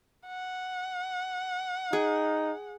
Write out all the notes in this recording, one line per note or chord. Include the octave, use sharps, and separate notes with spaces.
F#5
D#4 G#4